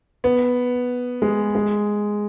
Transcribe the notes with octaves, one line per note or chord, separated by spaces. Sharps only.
B3
G#3
G#3